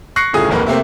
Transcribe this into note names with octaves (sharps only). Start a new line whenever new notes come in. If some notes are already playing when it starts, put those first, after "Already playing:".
C#6 F#6 A#6 C7 C#7
G1 A2 C#3 F4 G#4 D#6
D1 G#1 F2 A#3 A#4 B4
C3 A3 A#3 C4